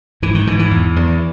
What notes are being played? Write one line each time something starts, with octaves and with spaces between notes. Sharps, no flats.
G#2 E3
D#3
G#2 E3
E3
E2
E2